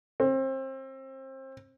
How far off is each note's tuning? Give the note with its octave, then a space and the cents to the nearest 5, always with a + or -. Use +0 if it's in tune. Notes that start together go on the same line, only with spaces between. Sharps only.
C4 +30